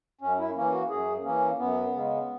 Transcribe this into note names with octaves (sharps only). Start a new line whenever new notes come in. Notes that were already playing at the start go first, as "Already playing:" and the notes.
F#2 C#4
E4
E3 A#3 C#4
F#4
F#2 G#4
E3 A#3 C#4
F#2 B3
C#3 G#3